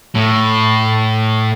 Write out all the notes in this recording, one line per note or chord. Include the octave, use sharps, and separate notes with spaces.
A2